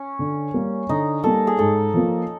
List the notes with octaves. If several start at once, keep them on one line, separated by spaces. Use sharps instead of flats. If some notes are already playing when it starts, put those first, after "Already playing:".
Already playing: C#4
D3
G3 A#3
D3 D#4
G3 A#3 A4
G#4
G#2 A4
F3 A#3